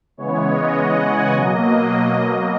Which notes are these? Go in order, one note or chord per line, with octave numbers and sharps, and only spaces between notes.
C#3 E3 G#3 B3 C#5
D#5
F#5
G#5
B2 F#3 A#3 D#5
D#5